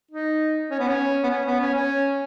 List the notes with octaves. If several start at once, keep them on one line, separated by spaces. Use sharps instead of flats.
D#4
C#4
B3
C#4
B3
C#4
B3
C#4
C#4